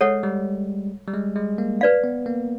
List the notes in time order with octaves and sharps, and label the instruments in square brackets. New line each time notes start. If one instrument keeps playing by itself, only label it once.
[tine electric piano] G#3 [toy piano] A4 C#5 F#5
[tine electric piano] G3
G3
G#3
G#3
A#3
[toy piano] B4 D5 F5
[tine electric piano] B3
A#3